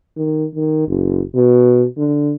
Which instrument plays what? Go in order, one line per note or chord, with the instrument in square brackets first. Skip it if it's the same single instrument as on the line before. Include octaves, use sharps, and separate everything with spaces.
[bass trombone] D#3
D#3
F#1
B2
D3